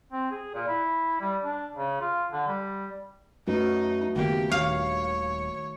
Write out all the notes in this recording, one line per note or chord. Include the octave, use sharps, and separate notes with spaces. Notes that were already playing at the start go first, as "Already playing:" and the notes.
C4
G#4
A#2
E4
G3
D4
C#3
F4
D3
G3
F#2 A3 D#4 F#4 B4
F#1 D#3 A#3 B3 G4
D#1 C#5 F5